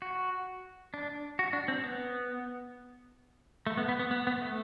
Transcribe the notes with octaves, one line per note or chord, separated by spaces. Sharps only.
F#4
D4
F#4
D4
C4
B3
A3
B3
B3
B3
B3
B3
A3